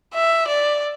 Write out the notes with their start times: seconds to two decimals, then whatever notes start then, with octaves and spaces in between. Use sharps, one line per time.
0.14 E5
0.48 D5